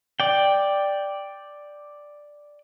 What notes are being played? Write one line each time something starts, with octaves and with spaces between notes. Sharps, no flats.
D5 G5